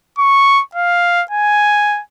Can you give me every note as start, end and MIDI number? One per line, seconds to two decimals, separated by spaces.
0.19 0.62 85
0.75 1.23 77
1.31 2.01 80